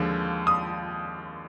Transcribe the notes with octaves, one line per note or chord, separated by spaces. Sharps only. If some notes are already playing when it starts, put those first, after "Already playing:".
Already playing: D#2 D3 F3 G#3
D#6